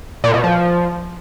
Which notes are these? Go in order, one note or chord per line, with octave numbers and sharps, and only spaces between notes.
A#2
B2
F3